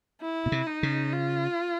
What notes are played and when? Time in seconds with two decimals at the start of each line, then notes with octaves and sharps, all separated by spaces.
0.22 E4
0.46 B2
0.52 C3
0.67 D#4
0.83 C#3
1.13 F4